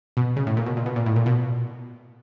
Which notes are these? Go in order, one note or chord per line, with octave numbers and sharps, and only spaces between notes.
B2
C#3
A2
A#2
B2
A#2
B2
A#2
A2
A#2
B2